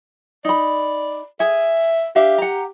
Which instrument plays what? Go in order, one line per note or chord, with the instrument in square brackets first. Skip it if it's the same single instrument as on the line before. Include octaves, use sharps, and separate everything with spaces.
[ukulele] D#4 B5 [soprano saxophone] D5
[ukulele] G#4 [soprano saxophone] E5
[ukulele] D4 E5 F5 [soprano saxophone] G4
[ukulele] F#5 A#5